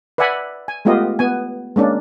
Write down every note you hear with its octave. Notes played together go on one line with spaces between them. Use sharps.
B4 D5 E5 F#5 G#5 B5
G#5
G#3 A3 B3 F4 G4 D#5
B3 G#5
G#3 A#3 C#4 D4